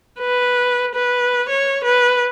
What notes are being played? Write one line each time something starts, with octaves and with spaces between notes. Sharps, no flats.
B4
B4
C#5
B4